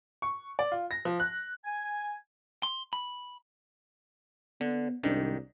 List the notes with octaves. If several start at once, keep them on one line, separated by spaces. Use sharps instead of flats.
C#6
D5
F4
A#6
F3
F#6
G#5
C6
B5
D3 B3
C2 G#2 D#3 D4